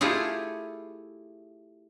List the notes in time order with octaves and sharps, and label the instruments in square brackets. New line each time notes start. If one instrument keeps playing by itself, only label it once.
[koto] A3 E4 F4 G4 G#4